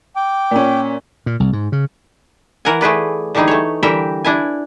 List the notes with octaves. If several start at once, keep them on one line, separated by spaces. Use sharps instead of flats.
G5 D6
A#2 C#4
A#2
C2
G#2
C#3
E3 A#4 F#5 G#5
A3 G#4 B4 D5
D3 E3 G3 D#4 G#4
A3 C#5
D3 E3 G3 A#4 E5 G5
D4 E4 G#5